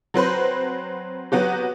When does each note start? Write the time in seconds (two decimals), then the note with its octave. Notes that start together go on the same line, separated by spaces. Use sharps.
0.14 F#3 C4 B4 C5
1.32 F#3 B3 F#4 G4